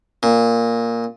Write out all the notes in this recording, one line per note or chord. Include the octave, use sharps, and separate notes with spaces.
A#2